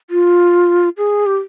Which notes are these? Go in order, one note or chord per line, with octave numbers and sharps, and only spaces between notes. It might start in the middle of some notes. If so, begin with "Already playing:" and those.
F4
G#4
G4